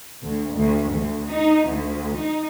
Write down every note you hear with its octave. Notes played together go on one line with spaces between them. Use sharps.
D2
D2
D2
D#4
D2
D#4